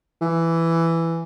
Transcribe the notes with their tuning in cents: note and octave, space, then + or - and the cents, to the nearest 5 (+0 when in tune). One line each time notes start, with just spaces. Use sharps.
E3 +10